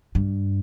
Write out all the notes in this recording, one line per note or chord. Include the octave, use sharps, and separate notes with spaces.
G2